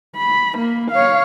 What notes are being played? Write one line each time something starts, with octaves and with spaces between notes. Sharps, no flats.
B5
A#3
C#5 F5